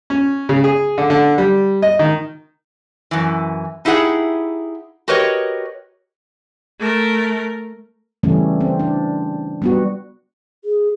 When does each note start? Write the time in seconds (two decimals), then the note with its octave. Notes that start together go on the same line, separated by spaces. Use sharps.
0.10 C#4
0.49 C#3
0.64 G#4
0.98 D3
1.10 D3
1.38 G3
1.82 D#5
1.99 D#3
3.11 F#2 E3
3.85 D#4 E4 G4 G#4 F#5
5.08 F#4 G4 A#4 B4 C#5 D#5
6.79 A3 A#4
8.23 C#3 E3 G3 A3 C#4
8.61 C4
8.80 D4
9.62 G3 B3 F#4
10.64 G#4